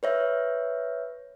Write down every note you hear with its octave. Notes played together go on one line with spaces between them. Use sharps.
B4 C#5 E5